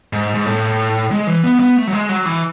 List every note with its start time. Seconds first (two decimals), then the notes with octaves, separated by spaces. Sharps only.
0.13 G#2
0.34 G#2
0.46 A2
1.11 G#3
1.27 E3
1.44 B3
1.60 B3
1.77 A3
1.87 F#3
1.93 G#3
2.09 F#3
2.26 E3